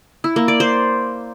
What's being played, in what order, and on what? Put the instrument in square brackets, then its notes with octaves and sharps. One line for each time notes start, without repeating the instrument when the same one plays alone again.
[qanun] E4
A#3
D5
C5